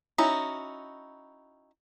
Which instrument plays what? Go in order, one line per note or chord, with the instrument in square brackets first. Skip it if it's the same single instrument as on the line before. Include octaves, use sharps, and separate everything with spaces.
[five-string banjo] C#4 D#4 E4 F#4